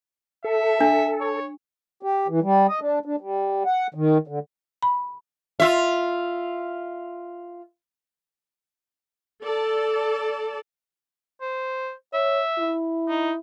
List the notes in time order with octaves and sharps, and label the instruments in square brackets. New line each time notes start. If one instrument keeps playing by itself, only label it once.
[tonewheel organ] A4 [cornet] E5
[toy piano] D4 [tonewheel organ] A4
[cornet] C#5
[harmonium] G4
E3
G3
D#5
D4
D4
G3
F#5
D#3
D3
[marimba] B5
[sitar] F4 E5
[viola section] A4 D5 A5
[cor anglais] C5
[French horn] C#5 [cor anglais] E5
[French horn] E4
[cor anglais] D#4